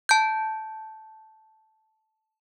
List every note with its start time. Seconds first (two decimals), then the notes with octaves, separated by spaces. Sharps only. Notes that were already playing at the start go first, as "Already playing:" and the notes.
0.09 A5 G6